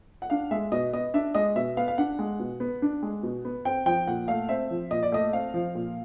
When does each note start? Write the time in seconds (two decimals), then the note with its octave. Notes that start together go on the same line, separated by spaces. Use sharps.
0.22 F#5
0.30 D4 F5
0.51 G#3 E5
0.72 B2 D#5
0.93 B3 D#5
1.14 D4 E5
1.35 G#3 D#5
1.56 B2 E5
1.77 B3 F5
1.88 F5
1.98 D4 F#5
2.19 G#3
2.40 B2
2.60 B3
2.82 D4
3.03 G#3
3.23 B2
3.45 B3
3.65 C4 G5
3.86 F3 G5
4.07 A#2 F#5
4.28 A3 F5
4.49 C4 E5
4.71 F3
4.91 A#2 D#5
5.03 D5
5.12 A3 D#5
5.33 C4 F5
5.54 F3
5.75 A#2